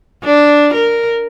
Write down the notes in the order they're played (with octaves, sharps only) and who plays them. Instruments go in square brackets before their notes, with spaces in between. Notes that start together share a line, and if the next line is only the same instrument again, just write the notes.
[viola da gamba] D4
A#4